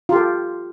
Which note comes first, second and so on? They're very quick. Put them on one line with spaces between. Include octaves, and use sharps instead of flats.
F4 G4 A4